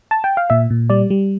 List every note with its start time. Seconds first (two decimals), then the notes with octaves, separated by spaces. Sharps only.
0.11 A5
0.24 G5
0.37 F5
0.50 A#2 E5
0.70 A#2
0.90 G3 D5
1.10 G3